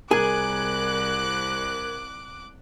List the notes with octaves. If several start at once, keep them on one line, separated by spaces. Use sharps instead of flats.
C2 G#4 A#4 D6 F#6 G#6